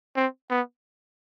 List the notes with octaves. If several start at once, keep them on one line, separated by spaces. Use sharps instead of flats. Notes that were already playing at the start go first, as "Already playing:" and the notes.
C4
B3